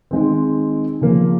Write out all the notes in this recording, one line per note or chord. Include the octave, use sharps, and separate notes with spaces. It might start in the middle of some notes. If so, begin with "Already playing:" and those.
D#3 G#3 C4
C#3 F3 A#3